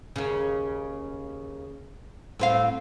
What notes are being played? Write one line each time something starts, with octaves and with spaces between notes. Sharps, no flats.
D#2 C#3
A2 C4 F5